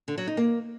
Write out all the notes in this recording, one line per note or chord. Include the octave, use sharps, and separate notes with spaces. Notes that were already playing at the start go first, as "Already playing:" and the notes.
D3
F#3
D#4
A#3